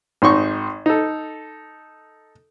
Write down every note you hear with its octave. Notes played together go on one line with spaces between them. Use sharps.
G#1 D#4 C6 C#6
D#4 A4